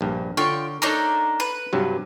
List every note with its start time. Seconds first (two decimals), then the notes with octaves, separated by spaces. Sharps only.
0.01 A#1 G2
0.37 D3 F4 C#5 G5 C#6
0.82 A#3 D4 D#4 A4 C#5 A#5
1.40 B4
1.73 G2 C3 F#3